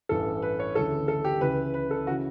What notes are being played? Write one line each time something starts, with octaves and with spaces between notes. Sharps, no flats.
A1 G2 E3 A4
B4
C#5
D2 C#3 E3 A4
A4
G4
C#2 C#3 E3 B4
B4
A4
C#3 E3 F#4